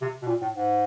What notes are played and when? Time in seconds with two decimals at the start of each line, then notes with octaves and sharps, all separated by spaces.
0.01 C3
0.22 B2
0.27 A#2
0.41 A2
0.54 G#2